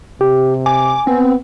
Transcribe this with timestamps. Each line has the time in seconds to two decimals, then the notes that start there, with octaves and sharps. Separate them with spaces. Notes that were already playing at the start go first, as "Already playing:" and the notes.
0.21 C3 G4
0.66 G#5 D6
1.07 B3 C4